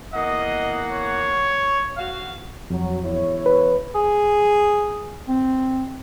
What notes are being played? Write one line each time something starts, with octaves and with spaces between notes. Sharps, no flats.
E2 A#3 D#5 F#5
C#5
F#4 F5
F2 F#3
E2 E4 C#5
B4
G#4
C4